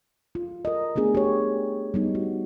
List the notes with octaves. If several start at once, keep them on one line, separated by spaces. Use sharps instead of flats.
F4
A#4 D#5
A3 B3 D4 G#4
G4 C#5
G3 B3 D#4
F#4